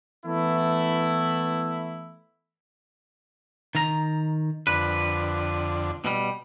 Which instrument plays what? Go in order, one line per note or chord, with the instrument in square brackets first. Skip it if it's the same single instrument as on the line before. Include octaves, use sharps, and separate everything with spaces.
[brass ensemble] E3 A3 B3 E4
[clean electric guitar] D#3 A#5
[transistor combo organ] F2 D3 [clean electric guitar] B4
[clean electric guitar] B2 G3